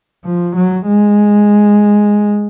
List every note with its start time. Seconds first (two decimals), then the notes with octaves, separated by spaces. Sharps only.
0.25 F3
0.56 F#3
0.87 G#3